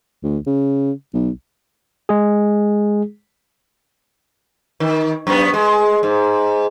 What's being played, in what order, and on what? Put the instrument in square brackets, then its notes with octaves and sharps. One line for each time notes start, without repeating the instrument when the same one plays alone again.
[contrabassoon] D2
C#3
B1
[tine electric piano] G#3 G#4
[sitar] D#3
F#2 B3
G#3
G#2